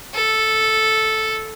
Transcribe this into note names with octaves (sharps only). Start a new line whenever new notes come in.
A4